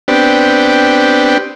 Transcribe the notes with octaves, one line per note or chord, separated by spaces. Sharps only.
B3 C4 D4 G4